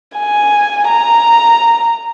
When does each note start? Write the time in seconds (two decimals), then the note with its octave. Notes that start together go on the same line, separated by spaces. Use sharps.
0.18 G#5
0.88 A#5